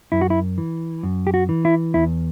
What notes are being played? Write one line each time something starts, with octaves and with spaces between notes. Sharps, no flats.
F#2 E4
F#4
E4
E3
F#2
G4
F#4
E3
E4
E2 E4